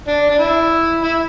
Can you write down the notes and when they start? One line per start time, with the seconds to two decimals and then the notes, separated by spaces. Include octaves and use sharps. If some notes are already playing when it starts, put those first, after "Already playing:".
0.08 D4
0.30 D4
0.39 E4
1.02 E4